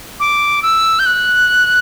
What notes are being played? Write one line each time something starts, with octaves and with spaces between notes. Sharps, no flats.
D6
E6
G6
F#6